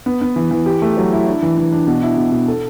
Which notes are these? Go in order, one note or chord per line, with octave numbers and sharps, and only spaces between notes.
B3
B3
E3
E3
G4
A3
F#3
E4
D4
E3
E3
D4
B2
E4
B2
B2
A4